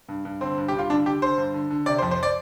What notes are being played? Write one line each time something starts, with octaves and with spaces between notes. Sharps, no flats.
G2
G2
D3 C4
G2
G2 G4
F4
D3 D4
D3 G4
D3 C5
G2
D3
D3
C3 D5
C5
F2
C5
D5